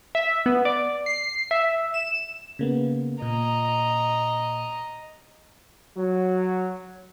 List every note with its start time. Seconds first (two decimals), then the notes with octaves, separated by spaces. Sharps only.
0.15 E5
0.46 B3
0.65 D5
1.06 C7
1.51 E5
1.94 E7
2.59 C#3 A#3 B3
3.22 A#2 D#5 A#5
5.96 F#3